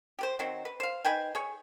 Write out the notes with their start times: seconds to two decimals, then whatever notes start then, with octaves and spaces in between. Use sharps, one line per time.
0.19 G4 B4 C5
0.39 D#3 F#3 C4
0.65 B4
0.80 C5 F5
1.04 D#4 B4 G5 G#5
1.35 G#4 C#5